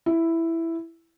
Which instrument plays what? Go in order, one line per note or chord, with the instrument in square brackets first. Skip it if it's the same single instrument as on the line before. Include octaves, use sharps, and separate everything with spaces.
[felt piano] E4